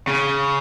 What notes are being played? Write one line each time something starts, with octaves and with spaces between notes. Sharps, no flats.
C#3